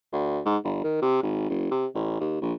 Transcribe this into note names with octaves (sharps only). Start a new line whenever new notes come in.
D2
G#2
G1
D#3
C3
G#1
F#1
C3
A1
D#2
A#1